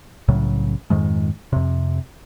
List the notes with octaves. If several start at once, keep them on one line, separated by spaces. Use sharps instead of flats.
C2 A2 C#3 F#3
F2 G#2 D#3 G#3
F2 C3